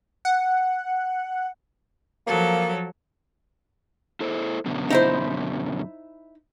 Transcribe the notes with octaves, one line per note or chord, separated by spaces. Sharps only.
F#5
F3 F#3 A#3 A4
E4 A4 C5
F#2 B2 D3
D#4 E4 C5